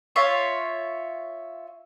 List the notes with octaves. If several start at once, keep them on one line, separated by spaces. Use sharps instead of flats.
F4 C#5 E5